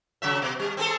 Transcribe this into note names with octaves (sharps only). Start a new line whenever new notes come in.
C#3 F#3 E5
B2
G3
C4 G#4 A4